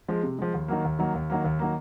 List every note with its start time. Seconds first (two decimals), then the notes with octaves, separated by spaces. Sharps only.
0.08 F3 G#3
0.23 C3
0.39 F3 G#3
0.54 D#2
0.68 D#3 F#3 A#3
0.84 D#2
0.99 D#3 F#3 A#3
1.14 D#2
1.30 D#3 F#3 A#3
1.45 D#2
1.59 D#3 F#3 A#3